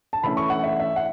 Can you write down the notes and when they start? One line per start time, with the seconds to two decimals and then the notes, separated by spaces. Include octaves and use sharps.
0.13 A5
0.23 E3 A3 C#4 B5
0.37 C#6
0.50 F#5
0.64 E5
0.80 E5
0.96 F#5